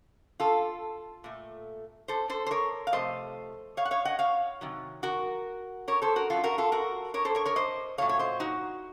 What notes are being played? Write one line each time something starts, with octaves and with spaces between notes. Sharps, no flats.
F4 A4
A#2 A3
A4 C5
A4 C5
C5
A#4 C#5
F5
C3 F3 A3 C5 D#5
C#5 F5
F#5
C#5 F5
D#5 F#5
C#5 F5
C3 D#3 F#3
F#4 A#4
A#4 C#5
A4 C5
F#4 A#4
F#2 C#3 F#3 F4 A4
F#4 A#4
F4 A4
F#4 A#4
A#4 C#5
A4 C5
A#4 C#5
A#4 C#5
C5 D#5
A#2 F#3 A3 C#5 F5
C#5
C5 D#5
D#4 F#4